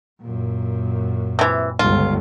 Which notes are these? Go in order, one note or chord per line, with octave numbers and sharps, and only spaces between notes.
F#2 A#2
C3 E3
G1 C#2 F4